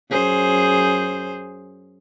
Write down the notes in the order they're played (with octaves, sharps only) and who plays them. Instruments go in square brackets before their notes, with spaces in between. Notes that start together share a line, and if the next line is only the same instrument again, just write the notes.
[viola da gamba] F#2 G#4 C5